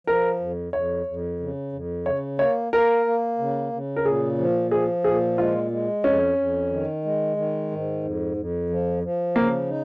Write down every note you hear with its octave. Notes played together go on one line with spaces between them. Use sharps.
F3 A#4
F2
F2 C#5
F2
C#3
F2
C#3 C#5
A#3 C#5
A#3 A#4
A#3
C#3
C#3
A#4
A#2 G#4
F3
F3 G#4
A#2 G#4
G#3 F4
G#3
F2 C#4
F2
D#3
G#3
D#3
G#2
F2
F2
F3
F3
C#3 A#3
D#4